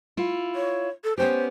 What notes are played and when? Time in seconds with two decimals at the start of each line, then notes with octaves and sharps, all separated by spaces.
0.17 E4 F4
0.55 C#5
1.04 A4
1.18 B3 C#4 G4 C5